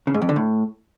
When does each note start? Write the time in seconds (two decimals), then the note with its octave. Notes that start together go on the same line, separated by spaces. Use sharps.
0.07 C#3
0.14 G#2
0.22 F2
0.29 D3
0.36 A2